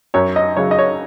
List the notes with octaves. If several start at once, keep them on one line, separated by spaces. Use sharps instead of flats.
F#2 C#5
D#5
C#3 F#3 C#5
D#5
C#5